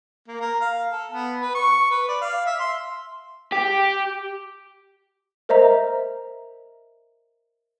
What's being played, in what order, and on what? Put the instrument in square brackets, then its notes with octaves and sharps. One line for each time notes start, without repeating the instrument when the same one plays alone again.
[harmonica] A#3
A#4
F5
A4
B3
B4
C#6
B4
D5
F5
E5
C6
[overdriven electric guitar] G4
[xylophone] A#4 C5 D#5 E5 A#5